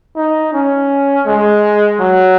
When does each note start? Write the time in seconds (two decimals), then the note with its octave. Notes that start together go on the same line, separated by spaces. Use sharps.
0.16 D#4
0.53 C#4
1.26 G#3
2.00 F#3